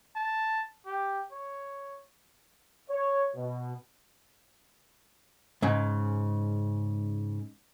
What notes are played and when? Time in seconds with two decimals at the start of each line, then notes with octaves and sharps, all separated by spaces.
0.16 A5
0.86 G4
1.32 C#5
2.90 C#5
3.35 B2
5.62 G#2 C#3